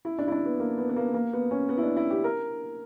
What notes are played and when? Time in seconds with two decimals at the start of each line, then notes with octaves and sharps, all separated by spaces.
0.05 E4
0.19 D4
0.28 E4
0.32 D4
0.46 B3
0.60 A#3
0.78 B3
0.89 B3
0.96 A#3
1.14 A#3
1.33 B3
1.51 C#4
1.69 B3
1.77 E4
1.83 D4
1.97 E4
2.10 G4
2.24 A#4